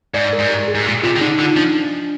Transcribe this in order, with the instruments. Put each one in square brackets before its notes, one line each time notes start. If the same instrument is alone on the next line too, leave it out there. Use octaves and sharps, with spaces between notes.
[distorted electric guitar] G#2 [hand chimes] D5
[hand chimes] A#4
[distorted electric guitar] G#2
[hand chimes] G4
G#4
[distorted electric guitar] G#2
A#2
[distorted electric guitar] C3 [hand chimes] F4
[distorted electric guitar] D#3
[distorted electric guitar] D3 [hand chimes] D#4
[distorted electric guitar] D3 [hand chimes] D#4
[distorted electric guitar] F3 [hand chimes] D4